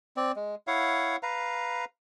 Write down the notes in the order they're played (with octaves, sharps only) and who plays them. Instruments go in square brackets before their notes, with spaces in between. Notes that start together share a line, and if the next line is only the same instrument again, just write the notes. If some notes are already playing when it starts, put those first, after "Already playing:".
[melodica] C4 D5
G#3
E4 C#5 F5 F#5
B4 F5 A#5